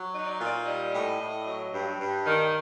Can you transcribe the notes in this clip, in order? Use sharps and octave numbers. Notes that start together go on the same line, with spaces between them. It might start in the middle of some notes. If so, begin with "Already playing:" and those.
Already playing: F#3
D#4
D5
A#2
D5
G3 D#5
A2
A2
F#3
G2
G2
D#3